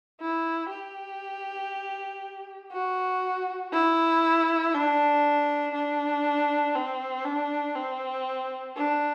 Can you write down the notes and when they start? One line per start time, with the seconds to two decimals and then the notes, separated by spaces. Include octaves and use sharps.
0.21 E4
0.70 G4
2.72 F#4
3.73 E4
4.74 D4
5.74 D4
6.75 C4
7.25 D4
7.76 C4
8.76 D4